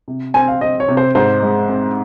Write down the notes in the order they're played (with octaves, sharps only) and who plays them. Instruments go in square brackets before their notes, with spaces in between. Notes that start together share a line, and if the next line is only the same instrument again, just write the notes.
[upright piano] C3
[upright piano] C4 [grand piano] G#5
[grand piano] F5
[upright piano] C4 [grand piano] D#5
[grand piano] C#5
[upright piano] C3
[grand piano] C5
[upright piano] G#2 [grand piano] C5
[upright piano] G#3
C4